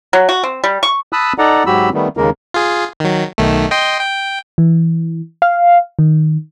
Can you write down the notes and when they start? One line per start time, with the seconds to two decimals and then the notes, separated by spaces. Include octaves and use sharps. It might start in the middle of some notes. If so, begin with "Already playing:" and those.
0.13 F#3
0.29 F#4
0.43 C4
0.64 G3
0.83 C#6
1.13 A5 B5 D#6 E6 F#6
1.38 D#4 A4 D5 F#5 A#5
1.66 G#2 F#3 F#4 G4 B5 E6
1.94 D#3 G3 A3 B3
2.17 D#2 C#3 G#3 A#3 A#4
2.54 F4 G#4
3.00 D#3 F#3
3.38 B1 D#3 A3
3.71 D#5 G5 C6
4.00 G5
4.58 E3
5.42 F5
5.99 D#3